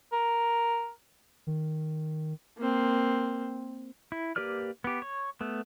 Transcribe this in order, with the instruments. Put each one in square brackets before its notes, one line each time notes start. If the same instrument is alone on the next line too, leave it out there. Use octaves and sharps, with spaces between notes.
[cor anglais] A#4
[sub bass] D#3
[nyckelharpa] A#3 C4
[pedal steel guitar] E4
A#3 G4 B4 D5 F6
B3 G4
C#5
A3 B3